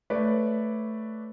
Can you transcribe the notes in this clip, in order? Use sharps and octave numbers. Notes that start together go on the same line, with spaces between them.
A3 B4 C#5 D5